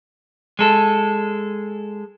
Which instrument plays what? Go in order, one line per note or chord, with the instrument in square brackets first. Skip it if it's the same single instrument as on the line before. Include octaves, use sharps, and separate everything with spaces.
[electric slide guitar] G#3 A4